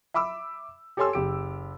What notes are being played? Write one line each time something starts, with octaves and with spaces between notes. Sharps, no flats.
E5 B5 D6 E6
G4 A4 C#5 G#5 C6 E6
F#1 G4 D7